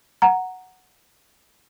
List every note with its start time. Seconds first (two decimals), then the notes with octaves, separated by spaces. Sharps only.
0.22 F#5 A#5